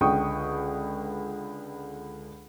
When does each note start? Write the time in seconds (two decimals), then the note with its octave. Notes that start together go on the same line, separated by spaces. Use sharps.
0.01 C#2 D3 G5 C#6 D#6